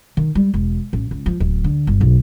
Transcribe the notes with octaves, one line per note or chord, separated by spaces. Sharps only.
D#3
G3
E1
A1
C#2
F3
D1
D3
G1
B1